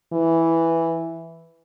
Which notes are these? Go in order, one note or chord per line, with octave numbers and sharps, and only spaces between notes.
E3